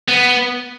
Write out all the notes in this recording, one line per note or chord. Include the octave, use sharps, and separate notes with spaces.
B3